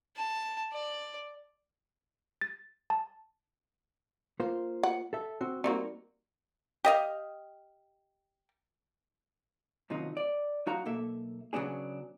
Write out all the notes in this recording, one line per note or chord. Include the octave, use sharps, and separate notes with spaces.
A5
D5
A6
A5
A#3 F4 C5
F#5
A4 E5
C4 F#4
G3 A#3 C4 D#4 F#4
G4 D#5 F5
F#2 C3 D#3 F3 F#3 D#4
D5
F#3 D#4 F#4 F5 A#5
B1 A#3 A4 E5
C#3 F#3 B3 D4 G#4